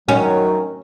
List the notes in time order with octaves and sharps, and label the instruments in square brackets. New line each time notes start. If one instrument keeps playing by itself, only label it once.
[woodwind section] F#2 D#3 F#3 [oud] C#4